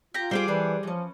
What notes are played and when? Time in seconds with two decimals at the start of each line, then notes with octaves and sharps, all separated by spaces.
0.14 F4 G4 A#5
0.31 G3 G#4 C5 G5 D6
0.48 E3 D4 A4 B4
0.83 E3 F3 C#4